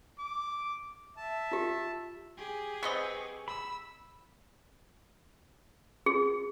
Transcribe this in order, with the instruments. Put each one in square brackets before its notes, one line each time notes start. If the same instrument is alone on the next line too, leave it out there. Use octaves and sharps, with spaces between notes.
[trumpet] D6
[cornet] E5 [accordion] A5
[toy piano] F4 G4
[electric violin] G4 G#4
[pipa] B3 C4 D#5 [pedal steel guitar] C#6
[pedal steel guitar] B5 [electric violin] E6
[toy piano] G#4